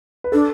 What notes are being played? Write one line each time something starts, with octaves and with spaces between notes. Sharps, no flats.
B4
D4 A4